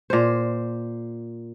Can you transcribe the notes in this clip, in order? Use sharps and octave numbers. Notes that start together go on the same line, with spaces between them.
A#2 C5